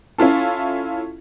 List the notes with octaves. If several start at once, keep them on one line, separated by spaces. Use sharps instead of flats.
C#4 E4 F4 A4